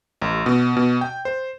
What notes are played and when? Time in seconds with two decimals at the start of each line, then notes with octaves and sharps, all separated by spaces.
0.22 A1
0.46 B2
0.77 B2
1.01 G5
1.25 C5